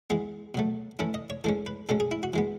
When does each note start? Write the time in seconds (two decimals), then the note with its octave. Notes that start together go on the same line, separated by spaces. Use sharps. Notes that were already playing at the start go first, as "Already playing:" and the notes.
0.10 E3 G#3 B3 G#4
0.55 B2 F#3 A3
0.99 E3 A3 C#4 E4
1.14 D#5
1.30 C#5
1.44 E3 G#3 C#4 A4
1.66 B4
1.89 B2 G#3 C#4 A4
2.00 G#4
2.11 E4
2.23 F#4
2.34 E3 G#3 B3